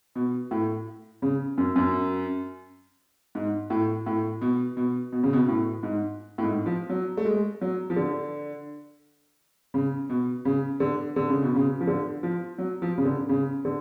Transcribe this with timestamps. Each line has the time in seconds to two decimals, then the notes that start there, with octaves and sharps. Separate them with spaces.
0.15 B2
0.51 A2
1.22 C#3
1.58 F#2
1.76 F#2
3.35 G#2
3.70 A2
4.06 A2
4.41 B2
4.77 B2
5.12 B2
5.23 C#3
5.33 B2
5.48 A2
5.83 G#2
6.38 A2
6.43 G#2
6.66 F3
6.90 F#3
7.17 A3
7.25 G#3
7.61 F#3
7.90 F3
7.96 D3
9.74 C#3
10.09 B2
10.45 C#3
10.80 D3
11.16 D3
11.29 C#3
11.42 B2
11.56 C#3
11.81 F3
11.87 D3
12.23 F3
12.58 F#3
12.82 F3
12.98 C#3
13.05 D3
13.29 C#3
13.65 D3